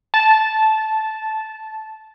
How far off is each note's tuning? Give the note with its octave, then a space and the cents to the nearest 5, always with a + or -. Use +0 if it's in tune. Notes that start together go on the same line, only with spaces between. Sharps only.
A5 -10